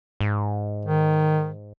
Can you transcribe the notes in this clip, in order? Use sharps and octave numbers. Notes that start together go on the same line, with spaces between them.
G#2
D#3